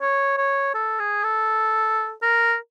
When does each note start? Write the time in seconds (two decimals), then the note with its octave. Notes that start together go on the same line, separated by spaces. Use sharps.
0.01 C#5
0.37 C#5
0.74 A4
0.99 G#4
1.24 A4
2.22 A#4